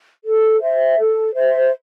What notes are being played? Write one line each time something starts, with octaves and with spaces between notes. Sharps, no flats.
A4
C5 E5
A4
C5 E5